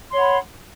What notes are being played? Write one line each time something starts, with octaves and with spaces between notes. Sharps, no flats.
C#5 F#5 B5 C6